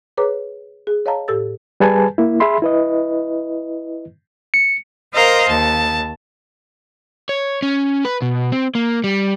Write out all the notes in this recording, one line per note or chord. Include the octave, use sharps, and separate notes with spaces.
G#4 B4 C#5 A#5 D6
G#4
C#5 D#5 F5 A5 A#5
A2 G4 A4 E6 A6
G3 G#4 B4 G#5 A5
A#3 E4
G#4 E5 B5 C6
E4 B4 D#5
C#7
A#4 C5 D#5 F5 A#5 C6
D#2 A5
C#5
C#4
B4
B2
C4
A#3
G3